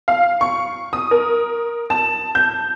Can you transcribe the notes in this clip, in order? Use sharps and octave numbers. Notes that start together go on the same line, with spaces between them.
F5
C#6
D#6
A#4
A5
G6